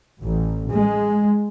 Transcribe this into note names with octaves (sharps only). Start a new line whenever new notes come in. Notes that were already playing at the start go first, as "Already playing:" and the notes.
A1
G#3